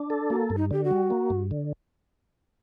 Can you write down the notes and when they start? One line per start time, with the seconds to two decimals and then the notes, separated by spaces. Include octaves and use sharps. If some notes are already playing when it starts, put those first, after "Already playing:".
Already playing: D4
0.10 A4
0.30 A#3 F#4
0.50 G2
0.57 D#4
0.71 D3 G4
0.84 F#4
0.91 G3
1.10 A#3
1.30 G2
1.51 D3